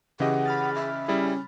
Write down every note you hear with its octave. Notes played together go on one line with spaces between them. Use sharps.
C#3 E3 C#4 G4 G#4 D#5 F#5
B5 F6 A6
E5
G3 C#4 E4 G#4